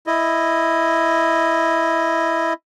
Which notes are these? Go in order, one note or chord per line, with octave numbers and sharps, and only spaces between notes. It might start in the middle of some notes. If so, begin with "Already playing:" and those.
E4 D#5